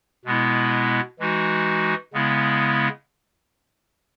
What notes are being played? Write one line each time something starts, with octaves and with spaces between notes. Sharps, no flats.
B2 G#3 B3 E4
E3 G#3 D#4 F#4
C#3 G#3 B3 E4